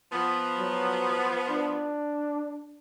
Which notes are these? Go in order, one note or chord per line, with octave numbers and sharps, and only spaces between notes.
F3 B3
F#3
D4